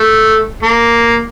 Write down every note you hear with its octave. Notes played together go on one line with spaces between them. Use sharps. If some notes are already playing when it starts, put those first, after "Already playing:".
Already playing: A3
A#3